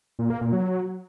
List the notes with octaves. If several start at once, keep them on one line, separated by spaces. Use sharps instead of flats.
A#2
A#3
A#2
F#3